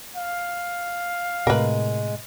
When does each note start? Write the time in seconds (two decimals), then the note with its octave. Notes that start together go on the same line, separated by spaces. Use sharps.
0.16 F5
1.47 A2 C3 G#3 A#4 B4